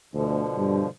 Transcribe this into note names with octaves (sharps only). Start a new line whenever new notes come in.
D2 B2 D3 F3
G2